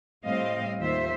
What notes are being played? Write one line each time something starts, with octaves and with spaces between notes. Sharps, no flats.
A2 G3 C4 D#5 F5
D#2 D#3 F4 C5 E5